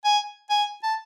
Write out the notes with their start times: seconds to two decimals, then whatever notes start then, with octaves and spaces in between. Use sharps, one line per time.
0.05 G#5
0.50 G#5
0.83 A5